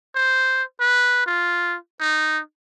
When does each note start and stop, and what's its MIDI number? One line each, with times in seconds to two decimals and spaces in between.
0.15 0.63 72
0.80 1.26 71
1.27 1.76 65
2.00 2.39 63